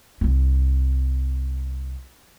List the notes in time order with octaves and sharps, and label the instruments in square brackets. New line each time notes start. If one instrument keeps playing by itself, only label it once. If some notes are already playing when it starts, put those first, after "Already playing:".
[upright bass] C2 C4